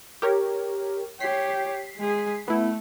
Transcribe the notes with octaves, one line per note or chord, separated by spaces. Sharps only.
G4 A#4 C#5
G4 C#5 B6 C7
G#3 G#4
A3 B3 E4